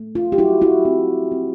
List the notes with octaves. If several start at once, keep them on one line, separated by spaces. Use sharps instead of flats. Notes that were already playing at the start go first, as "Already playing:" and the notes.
Already playing: A3
F4
G4
F#3 E4 F#4
E4 F#4
C4
C4